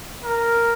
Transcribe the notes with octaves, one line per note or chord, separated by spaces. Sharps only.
A#4